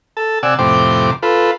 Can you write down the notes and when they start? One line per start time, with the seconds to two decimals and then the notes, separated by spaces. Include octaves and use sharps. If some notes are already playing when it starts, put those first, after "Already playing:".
0.17 A4 A5
0.43 C3 D5 F#5 G#5 E6
0.59 F2 A2 C3 C5 G5 D6
1.23 F4 A4 B4